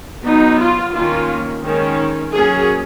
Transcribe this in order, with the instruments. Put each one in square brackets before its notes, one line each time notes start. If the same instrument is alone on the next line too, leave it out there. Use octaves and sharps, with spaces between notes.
[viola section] F#3 B3 D#4
F4
D#3 A#3 C#4 F4
D#3 G#3 C#4
F#3 A#3 C#4 G#4